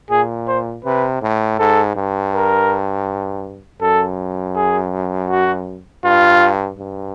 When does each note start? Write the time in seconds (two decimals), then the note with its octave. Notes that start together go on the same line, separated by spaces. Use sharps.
0.11 A#2 G#4
0.48 C5
0.84 C3 B4
1.22 A2
1.59 G#2 A4
1.96 G2
2.33 A#4
3.81 F#2 A4
4.55 G#4
5.30 F#4
6.04 G2 F4
6.79 G2